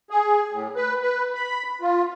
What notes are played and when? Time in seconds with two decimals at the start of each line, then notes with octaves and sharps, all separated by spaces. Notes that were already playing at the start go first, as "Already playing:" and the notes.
0.10 G#4
0.53 A2
0.76 B4
1.02 B4
1.35 B5
1.81 F4